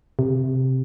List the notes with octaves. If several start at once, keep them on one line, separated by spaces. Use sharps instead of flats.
C3